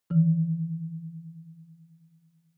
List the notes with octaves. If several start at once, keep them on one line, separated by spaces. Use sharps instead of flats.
D#3 E3